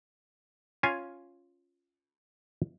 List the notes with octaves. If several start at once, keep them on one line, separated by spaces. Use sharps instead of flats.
C#4 F4 F5 G#5